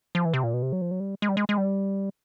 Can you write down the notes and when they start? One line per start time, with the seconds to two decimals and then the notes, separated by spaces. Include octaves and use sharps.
0.15 F3
0.25 E3
0.34 C3
0.44 A#2
0.54 B2
0.62 C3
0.72 F#3
0.82 F3
0.91 F#3
1.00 G3
1.22 G#3
1.29 G3
1.37 G#3
1.49 G#3
1.58 G3